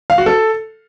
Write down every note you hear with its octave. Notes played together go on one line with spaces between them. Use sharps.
F5
F#4
A4